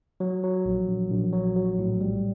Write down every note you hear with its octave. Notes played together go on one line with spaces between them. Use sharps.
F#3
F#3
A#1
A#1
A#1
F#3
F#3
A2
G3